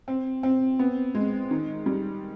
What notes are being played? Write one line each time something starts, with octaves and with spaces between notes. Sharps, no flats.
C4
C4
B3
G#3
D#3
G3